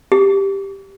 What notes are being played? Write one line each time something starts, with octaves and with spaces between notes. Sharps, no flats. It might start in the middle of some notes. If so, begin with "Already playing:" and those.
G4